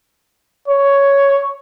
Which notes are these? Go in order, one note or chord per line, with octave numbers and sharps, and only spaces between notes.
C#5